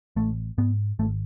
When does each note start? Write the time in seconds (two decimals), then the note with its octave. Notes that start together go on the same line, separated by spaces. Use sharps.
0.16 A1 A3
0.58 G#2 B3
0.99 G#1 A3